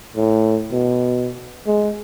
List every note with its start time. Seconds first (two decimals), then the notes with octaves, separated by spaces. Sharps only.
0.16 A2
0.72 B2
1.66 G#3